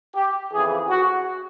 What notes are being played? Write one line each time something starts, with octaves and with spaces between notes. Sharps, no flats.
G4
F2 C#3 E3 G#4
F#4